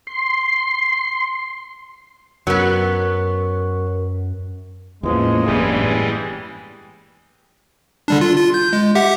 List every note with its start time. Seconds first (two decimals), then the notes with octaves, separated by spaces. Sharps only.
0.07 C6
2.47 F#2 F#3 B3 A#4
5.03 E2 A2 E3 F3 G#3 A#3 C#4
5.46 F#1 E2 G2 E3 G3 G#3 G#5
8.08 D3 G3 D4
8.21 F4
8.37 F4
8.54 G6
8.73 G#3
8.95 G4 E5 F#5